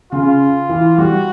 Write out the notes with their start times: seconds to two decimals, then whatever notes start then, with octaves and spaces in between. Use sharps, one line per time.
0.12 C#3 F4
0.69 E3
0.98 G3 F#4